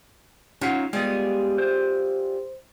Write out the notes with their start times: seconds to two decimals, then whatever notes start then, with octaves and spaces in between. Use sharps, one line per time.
0.61 F#3 C#4 D#4 F4
0.93 G3 G#3 B3 F4 G#4
1.58 C5